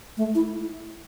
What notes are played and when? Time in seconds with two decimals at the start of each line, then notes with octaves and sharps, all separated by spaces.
0.17 A3
0.35 E4